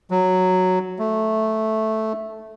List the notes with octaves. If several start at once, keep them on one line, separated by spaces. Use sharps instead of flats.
F#3
A3